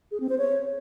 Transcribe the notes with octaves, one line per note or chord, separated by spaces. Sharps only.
G#4
C4
C5
C#5